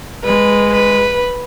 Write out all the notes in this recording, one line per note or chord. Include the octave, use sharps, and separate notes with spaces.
G#3 B4
B4